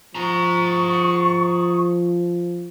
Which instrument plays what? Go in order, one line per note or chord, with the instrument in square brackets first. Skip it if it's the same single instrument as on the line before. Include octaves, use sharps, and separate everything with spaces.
[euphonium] F3 [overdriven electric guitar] G#4 A#5 [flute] C#6